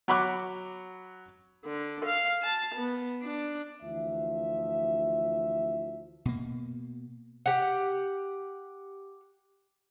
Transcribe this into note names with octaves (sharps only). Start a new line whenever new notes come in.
F#3 F#4 B5 C#6 D6 F#6
D3
F5
A5
B3
D4
D2 E3 F3 E5
B2 A#3
G4 F#5